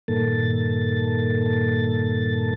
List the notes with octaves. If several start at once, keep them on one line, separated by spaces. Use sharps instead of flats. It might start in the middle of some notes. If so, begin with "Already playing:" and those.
G2 A#2 D#3 A#3 A4 A6